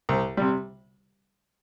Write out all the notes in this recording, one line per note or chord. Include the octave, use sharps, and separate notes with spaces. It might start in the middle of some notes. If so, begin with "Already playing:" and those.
C2
C3 G3